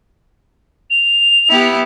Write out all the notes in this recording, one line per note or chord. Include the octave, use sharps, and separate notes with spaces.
F7
B3 E4 G4